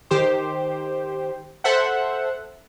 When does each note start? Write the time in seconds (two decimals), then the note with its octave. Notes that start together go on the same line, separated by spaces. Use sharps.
0.11 D#3 G4 C5
1.64 A4 C5 E5 F#5